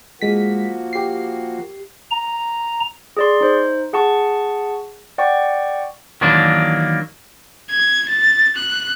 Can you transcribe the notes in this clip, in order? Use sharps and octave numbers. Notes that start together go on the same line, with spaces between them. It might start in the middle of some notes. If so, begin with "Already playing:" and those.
F3 G#3 A#3 F#4 B6
G4 C7
A#5
G#4 D5 C6
D#4 C5
G#4 F#5 A5 C#6
D5 F#5 G5 C#6
D#3 E3 F#3 A#3 D4
G#6
A6
F#6